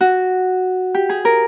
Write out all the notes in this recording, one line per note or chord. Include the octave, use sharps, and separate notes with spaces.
F#4
G4
G#4
A#4